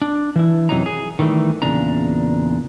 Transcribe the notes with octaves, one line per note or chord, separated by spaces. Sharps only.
D4
E3 E4
F#2 C3 E3 F#3 D#4 A#5
G#4
D#3 E3 G3 A3
E2 A#2 C#3 D4 A#5